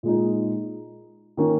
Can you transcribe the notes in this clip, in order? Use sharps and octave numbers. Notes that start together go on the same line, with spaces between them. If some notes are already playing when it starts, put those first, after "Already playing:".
A#2 G#3 D#4
D#3 A#3 C#4